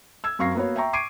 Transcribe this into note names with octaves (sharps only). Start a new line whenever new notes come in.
E6 G#6
F#2 C4 F5 C#6 A#6 C7
A#3 B3 F#4 B4 C#5
E5 G5 A#5 C#6
C#6 D6 G#6 C7 D7 D#7